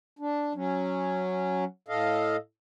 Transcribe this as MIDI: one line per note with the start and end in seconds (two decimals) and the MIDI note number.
0.19 0.53 62
0.55 1.65 54
0.55 1.65 61
1.88 2.36 45
1.88 2.36 69
1.88 2.36 75
1.88 2.36 77